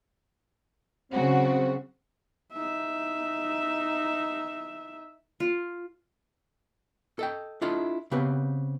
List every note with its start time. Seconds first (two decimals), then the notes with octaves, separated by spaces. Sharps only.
1.12 C#3 F#3 C4 F#4
2.53 D#4 E5
5.40 F4
7.19 A4 D#5 G5
7.62 D4 E4 F4 A4 D#5
8.11 C#3 B3 C4 G4 B4